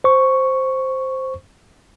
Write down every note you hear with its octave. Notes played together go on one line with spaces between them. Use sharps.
C5 C#6